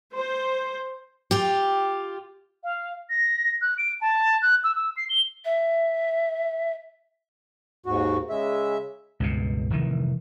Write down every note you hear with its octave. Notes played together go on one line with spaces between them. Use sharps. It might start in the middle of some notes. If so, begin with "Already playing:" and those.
C5
F4 G4
F5
A#6
F#6
D7
A5
F#6
E6
E6
C7
G7
E5
D#2 G#2 F#4
C#3 G#3 E5
C#2 G2 B2
F1 D#3 E3